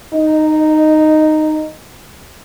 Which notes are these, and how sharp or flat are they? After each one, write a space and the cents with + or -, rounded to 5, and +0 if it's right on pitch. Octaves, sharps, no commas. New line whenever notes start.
D#4 -10